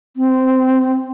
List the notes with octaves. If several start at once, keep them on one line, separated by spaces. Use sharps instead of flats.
C4